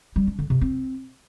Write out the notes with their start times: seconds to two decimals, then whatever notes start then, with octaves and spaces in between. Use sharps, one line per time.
0.16 G3
0.27 D4
0.39 D3
0.50 C3
0.61 C4